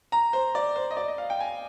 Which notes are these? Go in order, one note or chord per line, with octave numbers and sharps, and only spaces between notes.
A#5
C5
D5
C5
D#5
D5
D#5
F5
G5
G#5